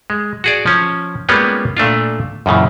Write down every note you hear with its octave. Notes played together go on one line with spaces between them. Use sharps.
G#3
F#4 G#4 D5
F3 C#4
G3 G#3 A#3 B3 C#4 F4
A#2 A3 D4 F4
F#2 A#2 C#3 E3